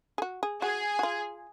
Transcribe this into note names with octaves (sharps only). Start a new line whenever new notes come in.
G#4
F#4
G#4
F#4 G#4
F#4
F4